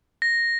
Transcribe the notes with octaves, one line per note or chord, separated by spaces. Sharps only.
A#6